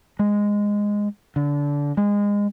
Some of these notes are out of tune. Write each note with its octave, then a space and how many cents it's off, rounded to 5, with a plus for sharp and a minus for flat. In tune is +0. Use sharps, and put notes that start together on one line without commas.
G#3 -10
D3 -25
G#3 -25